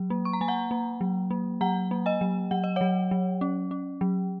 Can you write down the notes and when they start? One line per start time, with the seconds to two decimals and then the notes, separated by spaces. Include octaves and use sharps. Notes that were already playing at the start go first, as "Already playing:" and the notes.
Already playing: F#3
0.10 A#3
0.25 C#6
0.33 A#5
0.41 A#3 G#5
0.48 F#5 A#5
0.71 A#3
1.01 F#3
1.31 A#3
1.61 F#3 F#5 A#5
1.91 A#3
2.06 D#5 G#5
2.21 F#3
2.51 F#3 F#5
2.64 D#5
2.76 F#3 C#5 F#5
3.11 F#3
3.41 C#4
3.71 C#4
4.01 F#3